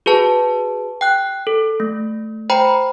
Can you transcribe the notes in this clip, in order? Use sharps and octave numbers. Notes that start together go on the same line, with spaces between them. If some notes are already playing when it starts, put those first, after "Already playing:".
F#4 G#4 B4 A5
G5 F#6
A4
A3
C5 G5 A#5 B5